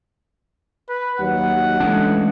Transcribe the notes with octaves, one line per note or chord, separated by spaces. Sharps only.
B4
D#2 F#3 F#5
E3 G#3 A3 C#4 D4